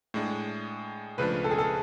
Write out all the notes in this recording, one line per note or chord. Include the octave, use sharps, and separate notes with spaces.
A2 G#3 D4 G#4
C#2 C#3 F3 A3 D4 B4
A4
G#4
A4